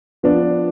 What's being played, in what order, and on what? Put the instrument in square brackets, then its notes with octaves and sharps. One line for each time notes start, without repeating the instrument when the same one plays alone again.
[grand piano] F3 B3 D4